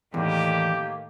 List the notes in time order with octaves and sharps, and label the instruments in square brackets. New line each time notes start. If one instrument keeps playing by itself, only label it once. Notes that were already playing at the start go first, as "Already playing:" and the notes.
[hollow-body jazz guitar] E2 [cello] A2 D#3 [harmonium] A#3 [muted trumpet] G4